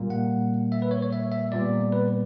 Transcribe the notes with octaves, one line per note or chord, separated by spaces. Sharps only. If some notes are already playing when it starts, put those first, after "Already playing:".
Already playing: A#2 G3 A#3
F#5
E5
B4
C#5
C#5
E5
E5
A#2 G3 B3 D5
B4